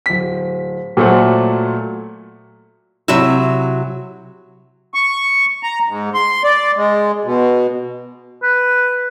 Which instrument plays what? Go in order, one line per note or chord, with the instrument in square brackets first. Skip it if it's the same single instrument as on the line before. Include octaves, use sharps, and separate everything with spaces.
[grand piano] D1 B6
A#2 F#3 A3 C5 F#5
[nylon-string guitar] C3 F#3 E4 F#4 E5
[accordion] C#6
A#5
G#2
C6
D5
G#3
B2
[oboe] B4